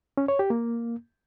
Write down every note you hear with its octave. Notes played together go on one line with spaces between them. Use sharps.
C#4
C#5
G4
A#3